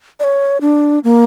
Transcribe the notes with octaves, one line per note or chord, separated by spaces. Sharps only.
D5
C#5
D4
A#3